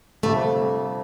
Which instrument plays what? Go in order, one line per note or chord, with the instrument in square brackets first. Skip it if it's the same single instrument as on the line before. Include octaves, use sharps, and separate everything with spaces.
[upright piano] G1 F2 C3 [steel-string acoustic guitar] A3